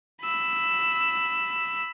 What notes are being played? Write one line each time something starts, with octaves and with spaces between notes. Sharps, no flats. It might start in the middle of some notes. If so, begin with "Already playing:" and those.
B5 E6